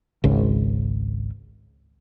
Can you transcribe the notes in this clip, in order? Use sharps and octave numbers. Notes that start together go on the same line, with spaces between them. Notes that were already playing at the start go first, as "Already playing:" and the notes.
G#1 C#2